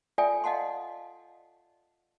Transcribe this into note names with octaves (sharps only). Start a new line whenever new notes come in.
F4 A4 D5 E5 G5 G#5
D#5 F5 F#5 A5 C6